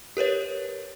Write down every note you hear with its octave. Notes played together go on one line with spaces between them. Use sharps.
G4 A#4 B4 C#5